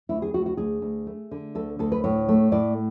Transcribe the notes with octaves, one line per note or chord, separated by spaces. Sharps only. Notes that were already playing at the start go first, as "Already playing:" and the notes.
D2 E4
G#4
D2 F#4
F#4
D2 G#4
D2
A3
D3
D2 A4
D2 A4
B4
A2 C#5
A3
A2 D5